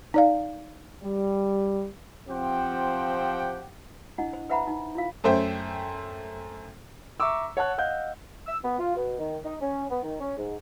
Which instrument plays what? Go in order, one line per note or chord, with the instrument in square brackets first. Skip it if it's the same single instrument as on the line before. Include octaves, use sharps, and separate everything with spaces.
[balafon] D#4 D5 F5
[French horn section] G3
[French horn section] F3 C4 [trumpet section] G4 F#5 G5
[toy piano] D4 E4 D#5 F#5
C5
B4 C5 E5 F#5 A#5 B5
D#4
E4 F4 F5
[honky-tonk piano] F#2 A3 C5 E5 G5
[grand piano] E5 A#5 C#6 D6 E6
C#5 F#5 A5 F#6
D#5 F5 F#5 G6
[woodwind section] E6
B3
F4
B2
D#3
D#4
C#4
B3
D#3
C#4
G#2